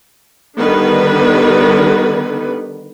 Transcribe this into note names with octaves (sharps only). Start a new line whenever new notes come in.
D3 D#3 G3 B3 D4 B4